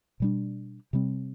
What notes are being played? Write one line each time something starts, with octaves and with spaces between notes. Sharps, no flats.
B2 G3 D4
C3 G3 C4